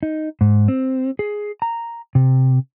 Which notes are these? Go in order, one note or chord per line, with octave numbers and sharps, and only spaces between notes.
D#4
G#2
C4
G#4
A#5
C3